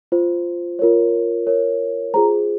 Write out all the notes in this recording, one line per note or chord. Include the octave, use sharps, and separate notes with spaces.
F4 C5
F4 A#4 C#5
F4 A#4 C#5
F4 G#4 C5 A#5